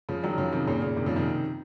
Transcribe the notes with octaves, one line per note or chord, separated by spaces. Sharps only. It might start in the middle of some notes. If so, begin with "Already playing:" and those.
C#3 F3
D#3 F#3
C#3 F3
C3 D#3
A#2 C#3
A#2 C#3
C3 D#3
C#3 F3
C3 D#3